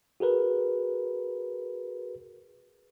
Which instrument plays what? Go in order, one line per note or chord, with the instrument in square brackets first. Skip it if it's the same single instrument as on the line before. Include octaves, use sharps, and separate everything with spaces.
[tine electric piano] F#4 G#4 A#4 B4